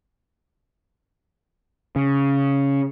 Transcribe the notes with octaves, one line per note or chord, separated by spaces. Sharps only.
C#3